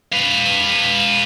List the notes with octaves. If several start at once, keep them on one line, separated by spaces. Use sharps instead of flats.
B4 F5